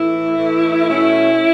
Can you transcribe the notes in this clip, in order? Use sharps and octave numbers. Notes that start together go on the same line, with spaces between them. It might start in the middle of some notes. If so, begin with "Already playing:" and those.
Already playing: A2 E3 A3 E4
A2 E3 A3
B2 A3 C#4 E4